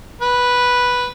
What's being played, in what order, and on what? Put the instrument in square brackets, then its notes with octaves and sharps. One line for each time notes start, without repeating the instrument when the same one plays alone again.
[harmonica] B4